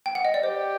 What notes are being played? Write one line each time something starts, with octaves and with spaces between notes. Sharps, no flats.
G5
F#5
D#5
D5
G4 C5